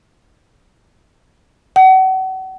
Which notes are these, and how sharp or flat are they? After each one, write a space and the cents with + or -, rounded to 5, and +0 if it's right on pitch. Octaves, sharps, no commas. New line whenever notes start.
F#5 +35